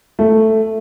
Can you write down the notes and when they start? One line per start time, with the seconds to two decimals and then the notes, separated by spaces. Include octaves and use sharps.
0.19 A3